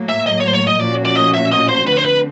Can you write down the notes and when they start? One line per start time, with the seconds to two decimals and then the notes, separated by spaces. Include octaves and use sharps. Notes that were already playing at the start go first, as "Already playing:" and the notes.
Already playing: A2 F#3 A#3
0.09 E5
0.26 D#5
0.40 C#5
0.47 C5
0.53 C#5
0.67 D#5
0.80 A#2 F3 A#3 C#4 F#4 D5
1.05 D5
1.16 D#5
1.34 E5
1.52 D#5
1.68 C5
1.87 D3 F3 A3 C4 B4
1.97 C5
2.05 B4